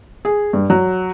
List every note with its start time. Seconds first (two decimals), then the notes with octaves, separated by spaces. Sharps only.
0.25 G#4
0.53 G2
0.70 F#3